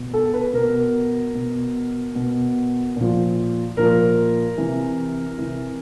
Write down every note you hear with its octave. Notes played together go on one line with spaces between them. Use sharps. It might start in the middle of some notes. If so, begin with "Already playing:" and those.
Already playing: B2
A4
B4
B2 A#4
B2
B2
A#2 F3
A#2 F3 A#4
C3 E3
C3 E3